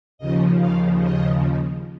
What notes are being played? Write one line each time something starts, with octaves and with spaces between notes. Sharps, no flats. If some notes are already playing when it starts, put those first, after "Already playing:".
D#2 C#3 F3 D#5
F5
D#5